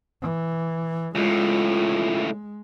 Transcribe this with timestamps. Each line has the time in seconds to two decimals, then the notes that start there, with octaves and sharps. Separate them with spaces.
0.22 E3
1.15 C#2 A2 G#3 F4